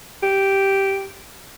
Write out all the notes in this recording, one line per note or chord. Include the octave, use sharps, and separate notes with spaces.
G4